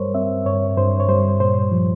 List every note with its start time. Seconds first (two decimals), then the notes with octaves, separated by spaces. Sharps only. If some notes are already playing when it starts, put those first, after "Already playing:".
Already playing: G2 G3 A#4 C5 C#5
0.14 C4 E5
0.45 G2 C#5
0.77 G2 C5
1.00 C#5
1.08 G3 C5
1.40 A#2 C5
1.72 F3